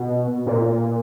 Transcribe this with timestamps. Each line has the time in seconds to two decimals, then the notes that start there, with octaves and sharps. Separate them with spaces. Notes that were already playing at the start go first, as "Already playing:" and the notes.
Already playing: B2
0.46 A#2